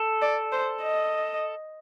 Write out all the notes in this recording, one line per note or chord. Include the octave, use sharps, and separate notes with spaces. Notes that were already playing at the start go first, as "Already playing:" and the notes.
Already playing: A4
D5
C5
D#5